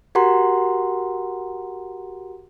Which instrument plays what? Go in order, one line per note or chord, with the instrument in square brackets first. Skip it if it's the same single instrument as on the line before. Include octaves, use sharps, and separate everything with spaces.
[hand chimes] F#4 G4 A#4 F#5 A#5 C6